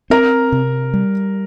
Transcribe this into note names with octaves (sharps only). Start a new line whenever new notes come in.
C4 A#4 A#5
C3
G3